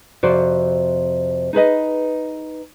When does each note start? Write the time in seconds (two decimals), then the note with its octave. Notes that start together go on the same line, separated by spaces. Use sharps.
0.23 F2 C3 F#4 C5 D5
1.53 D#4 G#4 B4 D#5